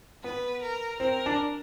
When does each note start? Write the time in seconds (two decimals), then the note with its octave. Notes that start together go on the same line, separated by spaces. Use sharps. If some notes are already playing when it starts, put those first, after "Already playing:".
0.24 B3 B4
0.62 A#4
1.00 C4 A#4
1.26 D4